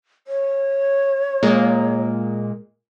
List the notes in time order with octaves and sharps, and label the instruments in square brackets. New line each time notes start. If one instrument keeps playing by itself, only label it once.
[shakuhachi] C#5
[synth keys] A#2 G#3 A#3